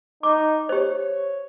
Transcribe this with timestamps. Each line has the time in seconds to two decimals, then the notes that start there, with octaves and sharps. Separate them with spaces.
0.23 D#4 D6
0.69 G4 C5 C#5